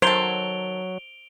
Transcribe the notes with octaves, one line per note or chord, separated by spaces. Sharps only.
D#3 F#3 A4 C5 D7 F7 G7